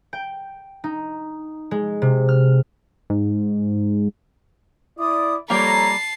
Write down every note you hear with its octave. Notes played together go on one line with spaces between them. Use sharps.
G5
D#4
G#3
C3
F6
G#2
E4 D5 D#6
F2 G3 A#3 A4 C#5 A5 A#5 C7